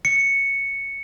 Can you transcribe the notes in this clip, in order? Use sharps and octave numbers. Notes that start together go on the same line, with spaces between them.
C#7